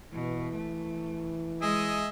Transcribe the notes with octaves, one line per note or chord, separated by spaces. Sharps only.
B2 E3
A3
G#3 G#4 D#5 E5